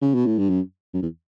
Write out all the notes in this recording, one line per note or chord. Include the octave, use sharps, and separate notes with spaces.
C#3
B2
A2
G2
F#2
F#2
E2